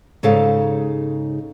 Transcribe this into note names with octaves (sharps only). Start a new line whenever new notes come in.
G#2 C#3 D#4 A4 F5